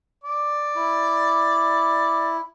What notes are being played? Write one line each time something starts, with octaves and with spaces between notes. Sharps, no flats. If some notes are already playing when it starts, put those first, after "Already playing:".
D5
E4